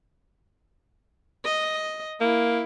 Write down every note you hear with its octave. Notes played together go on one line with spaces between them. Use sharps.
D#5
A#3 E4